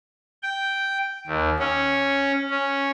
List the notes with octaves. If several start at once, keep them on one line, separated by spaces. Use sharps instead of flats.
G5
D#2
C#4
C#4